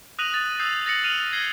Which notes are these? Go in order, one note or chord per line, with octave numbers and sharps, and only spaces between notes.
D#6 F#6 A#6 D#7 F7 F#7
A6 D#7
D#6 E6 G6 C7
A6 A#6 C7 C#7 F#7
D#6 F6 D#7 F7 F#7
D#6 G#6 A#6 C7 G7